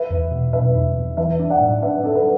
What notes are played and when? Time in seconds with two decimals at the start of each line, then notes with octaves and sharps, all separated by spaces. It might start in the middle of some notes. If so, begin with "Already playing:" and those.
Already playing: B4 E5
0.10 E2
0.31 B2
0.53 B2 B4 E5
0.75 E2
0.96 E2
1.17 E3 B4 E5
1.40 D4
1.50 D5 F#5
1.61 A2
1.82 D4 B4 E5
2.04 D4 A4
2.15 B4